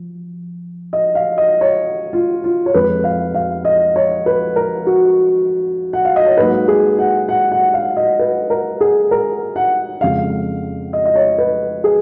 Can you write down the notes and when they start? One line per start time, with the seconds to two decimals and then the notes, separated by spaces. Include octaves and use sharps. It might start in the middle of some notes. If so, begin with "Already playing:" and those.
Already playing: F3
0.93 D#5
1.15 F5
1.38 D#5
1.61 C#5
2.13 F4
2.44 F4
2.66 C#5
2.74 F2 F3 G#3 B4
3.04 F5
3.34 F5
3.65 D#5
3.96 C#5
4.26 B4
4.56 A#4
4.87 F#4
5.93 F#5
6.05 F5
6.16 D#5
6.26 C#5
6.37 G#2 F#3 A#3 B4
6.68 G#4
6.99 F#5
7.29 F#5
7.52 F#5
7.74 F5
7.97 D#5
8.19 B4
8.50 A#4
8.81 G#4
9.11 A#4
9.56 F#5
10.01 F2 C#3 G#3 F5
10.93 D#5
11.05 D#5
11.15 C#5
11.38 B4
11.84 G#4